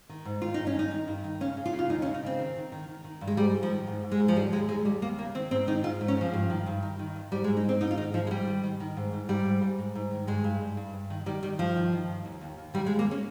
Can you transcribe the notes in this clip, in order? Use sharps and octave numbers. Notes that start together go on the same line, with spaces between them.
D#3
G#2
D#3 F4
G2 D#4
C#4
D#3 D#4
D#3
G2
D#3
C#3 C#4
C#3
F4
C#3
F4
D#2 D#4
C#4
C#3
D#4
C#3 C4
D#3
D#3
D#3
D#3
D#3
G2
G#3
G#2 G3
G#2
F3
D#3
G#2
G#2
G#3
G#2
F3
D#2 G3
D#2 G#3
D#2 G#3
D#2 G3
D#2 A#3
C#3 A#3
D#3 C4
G#2 C4
D#3 D#4
G#2 F4
G#2
C#4
G#2 F3
G2
D#3
G2
D#3
D#3
G2
G#2 G3
G#3
G#2
D#4
G#2 C4
G#2 D#4
F4
D#3 D#4
G#2 F3
G#3
G#2 G3
D#3
D#3
D#3
G#2
G#2
G#2 G3
G#2
G#2
G#2
G#2
D#3
G2 G#3
G2
G2
G2
G2
D#3
D#3 G3
D#3 G3
G2 F3
D#3
D#3
G2
D#2
D#2
D#2
D#3 G3
G#3
D#2
A#3
C#4